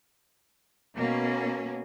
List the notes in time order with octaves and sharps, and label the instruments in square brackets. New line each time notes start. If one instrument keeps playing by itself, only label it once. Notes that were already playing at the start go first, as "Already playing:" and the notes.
[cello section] B2 A#3 C#4